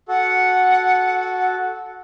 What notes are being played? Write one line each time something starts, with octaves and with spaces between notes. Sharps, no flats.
F#4 A4 F#5